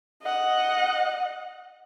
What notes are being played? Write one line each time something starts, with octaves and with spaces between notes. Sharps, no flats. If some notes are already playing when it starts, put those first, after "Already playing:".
D#5 F#5